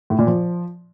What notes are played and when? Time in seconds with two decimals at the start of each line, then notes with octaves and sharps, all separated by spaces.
0.10 A2
0.19 A#2
0.27 F3